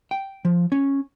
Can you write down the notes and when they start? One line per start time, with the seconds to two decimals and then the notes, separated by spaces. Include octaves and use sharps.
0.11 G5
0.45 F3
0.72 C#4